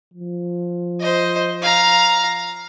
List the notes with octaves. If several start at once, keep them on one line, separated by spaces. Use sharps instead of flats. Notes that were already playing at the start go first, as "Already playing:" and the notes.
F3
C5 D#5
F5 A#5